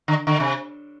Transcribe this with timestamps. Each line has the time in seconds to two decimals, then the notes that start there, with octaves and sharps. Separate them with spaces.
0.08 D3
0.27 D3
0.40 C3